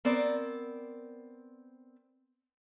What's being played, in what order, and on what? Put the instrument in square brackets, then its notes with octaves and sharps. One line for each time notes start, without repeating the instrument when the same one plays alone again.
[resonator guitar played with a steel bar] B3 C4 A#4 D5